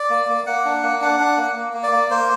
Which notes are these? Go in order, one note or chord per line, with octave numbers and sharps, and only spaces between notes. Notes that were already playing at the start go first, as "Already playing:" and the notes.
Already playing: D5
A#3
A#3
A#3 F#5
D4
A#3
D4 F#5
D4
A#3
A#3
A#3
D5
A#3
A#3 C5